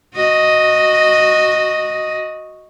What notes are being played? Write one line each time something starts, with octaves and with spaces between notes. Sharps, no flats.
F#4 D#5